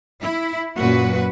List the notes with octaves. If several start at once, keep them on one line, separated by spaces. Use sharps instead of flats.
E4
F#2 A#2 F#4 B4